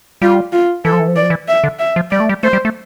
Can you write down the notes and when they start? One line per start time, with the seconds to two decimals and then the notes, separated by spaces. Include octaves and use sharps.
0.22 G3 F4
0.53 F4
0.85 E3 A4
0.93 F3
1.00 E3
1.08 F3
1.16 E3 D5
1.23 F3
1.30 E3
1.48 E5
1.64 D3
1.79 E5
1.96 F3
2.11 G3 D5
2.20 A3
2.29 G3
2.43 A3 C5
2.53 G3
2.65 A3